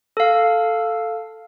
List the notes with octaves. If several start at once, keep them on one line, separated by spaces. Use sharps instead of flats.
A4 F5